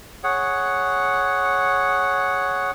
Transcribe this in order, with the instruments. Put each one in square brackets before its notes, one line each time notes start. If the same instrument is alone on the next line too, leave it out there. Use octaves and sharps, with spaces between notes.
[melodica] G#4 C#5 F#5